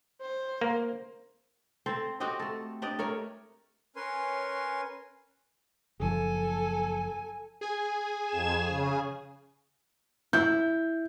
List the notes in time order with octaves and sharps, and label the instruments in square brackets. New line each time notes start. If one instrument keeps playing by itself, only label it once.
[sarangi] C5
[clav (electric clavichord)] A#3
[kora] C4 A4 C5
C4 F#4 G4 D#5
A3 A4
D4 G4 D5 D#5
A3 A#4 C#5
[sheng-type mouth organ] C#4 A#4 B4 C#5 G#5 C6
[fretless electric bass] F#1 F3 [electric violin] A4 G#5
[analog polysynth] G#4 G#5
[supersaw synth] F2 G#6 E7
C#3
[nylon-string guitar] E4 [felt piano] G6